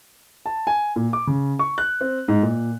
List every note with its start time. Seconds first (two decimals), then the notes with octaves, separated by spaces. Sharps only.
0.46 A5
0.67 G#5
0.96 A#2
1.13 D6
1.27 C#3
1.59 C#6
1.78 F#6
2.01 C4
2.28 G#2
2.43 A#2